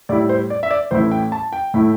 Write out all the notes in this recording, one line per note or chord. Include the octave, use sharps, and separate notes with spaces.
A2 G3 E4 D5
C5
D5
E5
D5
A1 A2 A3 E4 C5
G5
A5
G5
A2 A3 E4